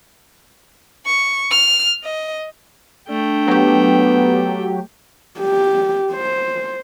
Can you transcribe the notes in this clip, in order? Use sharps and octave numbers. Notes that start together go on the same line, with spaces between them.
C#6
F6
D#5
A3 D4 G5
F#3 B3 G4
G4
C5